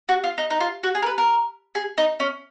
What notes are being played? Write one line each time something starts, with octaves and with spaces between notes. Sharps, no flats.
F#4
F4
D#4
D#4
F4
F#4
G#4
A#4
B4
A#4
G#4
D#4
C#4